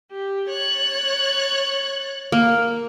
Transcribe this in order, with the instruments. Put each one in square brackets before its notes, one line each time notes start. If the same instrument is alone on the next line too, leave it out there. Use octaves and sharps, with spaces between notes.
[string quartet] G4
C#5 F#6 A6
[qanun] A#3